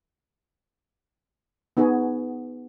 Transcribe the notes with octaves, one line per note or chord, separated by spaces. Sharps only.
B3 D#4 F#4 G#4